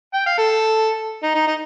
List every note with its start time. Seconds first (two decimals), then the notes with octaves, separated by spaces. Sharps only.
0.14 G5
0.26 F5
0.38 A4
1.23 D#4
1.35 D#4
1.47 D#4